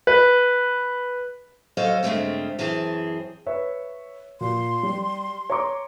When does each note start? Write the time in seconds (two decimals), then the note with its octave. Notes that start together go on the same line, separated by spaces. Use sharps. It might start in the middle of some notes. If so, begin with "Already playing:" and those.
0.07 B4
1.77 F#3 A4 C5 D#5 F5
2.03 G2 C#3 G#3 A3 C4 C#4
2.59 F#2 E3 C4 G#4 A5
3.46 B4 C#5 E5
4.41 A#2 C6
4.83 G3
5.50 C#5 A#5 D6